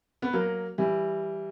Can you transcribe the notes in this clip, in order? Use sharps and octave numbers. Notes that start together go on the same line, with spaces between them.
B3
F#3 A#3
E3 G3